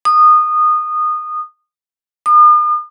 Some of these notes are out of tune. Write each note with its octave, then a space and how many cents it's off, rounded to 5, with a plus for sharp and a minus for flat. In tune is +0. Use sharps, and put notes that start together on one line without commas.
D#6 -20
D#6 -45